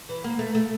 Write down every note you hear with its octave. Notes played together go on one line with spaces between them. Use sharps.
E3
A#3
A3
A3